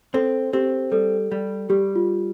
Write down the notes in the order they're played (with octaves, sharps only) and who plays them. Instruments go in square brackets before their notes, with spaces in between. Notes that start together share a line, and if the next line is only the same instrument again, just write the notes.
[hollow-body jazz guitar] C4 [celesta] A4
[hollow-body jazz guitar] C4 [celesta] G4
[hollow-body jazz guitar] G3 [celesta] A4
[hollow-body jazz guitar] G3
[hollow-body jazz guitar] G3 [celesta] G4
[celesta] F4